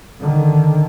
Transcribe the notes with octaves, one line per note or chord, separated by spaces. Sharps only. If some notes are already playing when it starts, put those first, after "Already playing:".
D3 D#3